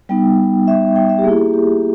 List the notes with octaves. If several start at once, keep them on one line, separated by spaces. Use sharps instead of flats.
G3 B3 D#4 G5
E5
G5
E5
G4
A#3 E4 G#4
G#4
G4